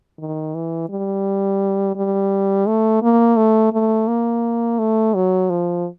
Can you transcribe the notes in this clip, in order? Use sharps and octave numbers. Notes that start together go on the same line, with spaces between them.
D#3
E3
G3
G3
A3
A#3
A3
A3
A#3
A3
F#3
F3